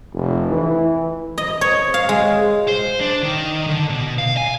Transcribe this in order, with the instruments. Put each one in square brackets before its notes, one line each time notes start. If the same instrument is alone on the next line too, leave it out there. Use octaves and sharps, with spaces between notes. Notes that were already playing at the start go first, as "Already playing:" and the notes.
[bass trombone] F1
E3
[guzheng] D#5
C#5
F5
G#3
[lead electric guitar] C5
D4
D#3
D3
B2
F5
G#5